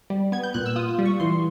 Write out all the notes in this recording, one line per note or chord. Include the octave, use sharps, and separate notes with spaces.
G3
B3 G#6
G6
A#2 F#6
E6
F4 D#6
G3
C#6
E3 C6